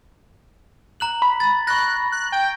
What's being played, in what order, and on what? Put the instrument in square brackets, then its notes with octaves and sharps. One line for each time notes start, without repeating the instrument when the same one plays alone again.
[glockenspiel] A#5 F#6 F#7
[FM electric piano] B5
[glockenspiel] A6
[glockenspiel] C#6 A#6 [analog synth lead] F#6
[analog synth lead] F#6
G5